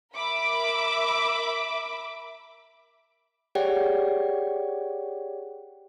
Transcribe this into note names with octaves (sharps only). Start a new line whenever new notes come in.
A#4 E5 B5 D6
G4 G#4 C#5 D5 F#5 G5